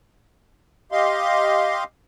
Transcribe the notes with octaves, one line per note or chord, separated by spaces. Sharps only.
G4 D#5 F5 C6